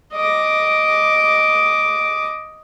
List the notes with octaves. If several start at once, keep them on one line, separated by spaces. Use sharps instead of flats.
D#5 D6